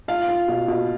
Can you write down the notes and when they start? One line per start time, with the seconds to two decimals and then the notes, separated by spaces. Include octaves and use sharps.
0.08 F4 F5
0.28 F4
0.48 B2
0.68 B2